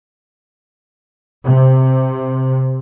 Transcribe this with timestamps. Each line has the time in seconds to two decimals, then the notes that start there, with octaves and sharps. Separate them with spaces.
1.45 C3